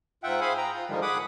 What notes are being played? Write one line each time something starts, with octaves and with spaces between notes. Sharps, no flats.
G#2 F4 E5 F#5 G5
G#4 C5 F5 G#5 B5
G5 A#5
F4
G#2 D3 D#3 F3 G3 G#3
G#4 F#5 B5 D6 D#6